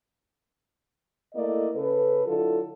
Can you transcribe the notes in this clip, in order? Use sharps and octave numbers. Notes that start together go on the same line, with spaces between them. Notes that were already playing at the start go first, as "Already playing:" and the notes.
A3 A#3 E4 A4 D5 D#5
C#3 A4 B4
D3 F#3 E4 F4 A4